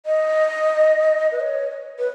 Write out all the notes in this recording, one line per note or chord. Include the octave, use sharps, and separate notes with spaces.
D#5
B4
C#5
B4